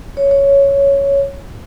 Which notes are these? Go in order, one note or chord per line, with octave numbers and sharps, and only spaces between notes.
C#5
C#5